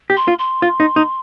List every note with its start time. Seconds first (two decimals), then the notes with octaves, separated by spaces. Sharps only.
0.10 G4
0.17 C6
0.28 F4
0.39 C6
0.62 F4
0.80 D#4
0.96 D#4